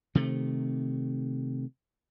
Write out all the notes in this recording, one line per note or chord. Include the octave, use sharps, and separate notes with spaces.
C3 D#3 A3